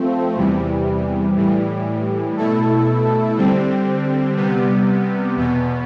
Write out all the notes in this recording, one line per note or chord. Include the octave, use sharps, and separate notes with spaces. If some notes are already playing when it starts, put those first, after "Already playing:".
Already playing: F3 A3 C4
E2 C3 E3 G3
A2 E3 G3
B2 A3 E4 A4
D3 G3 C4
C3 G3 B3
E2 B2 B3